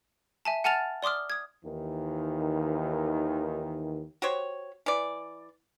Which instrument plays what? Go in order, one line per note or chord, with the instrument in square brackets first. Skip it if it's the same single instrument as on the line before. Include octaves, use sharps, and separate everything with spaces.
[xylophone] E5 G#5 A5
F#5 G#5 A5 F6 A6 F7
D5 C6 D6 D#6 F6
D#6 G#6
[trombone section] D#2 D#3 E3
[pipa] F#4 G4 C5 C#5
E3 D5